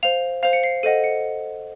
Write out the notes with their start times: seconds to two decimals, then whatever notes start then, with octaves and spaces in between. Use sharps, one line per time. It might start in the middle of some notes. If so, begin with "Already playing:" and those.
0.03 C5 F5 F7
0.43 C5 F5 F7
0.53 C#7
0.63 C7
0.83 A4 C5 D#5 F#5 D#7
1.04 C#7